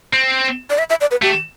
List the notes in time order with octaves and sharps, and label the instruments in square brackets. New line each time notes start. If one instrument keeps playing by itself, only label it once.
[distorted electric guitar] C4
[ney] D5
E5
E5
D5
B4
[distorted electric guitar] A3 [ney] G4